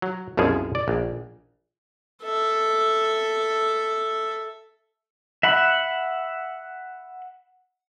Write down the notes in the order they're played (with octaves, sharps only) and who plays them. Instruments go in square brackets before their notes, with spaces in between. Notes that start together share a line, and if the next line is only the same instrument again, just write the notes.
[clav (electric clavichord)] F#3
C2 F#2 B2 F3 G#4
D5
A#1
[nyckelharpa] A4 E5
[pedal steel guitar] E5 F#5 B5